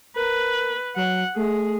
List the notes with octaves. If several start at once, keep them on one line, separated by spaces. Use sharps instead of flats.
A#4 B4
F#3 F#5
A3 G#4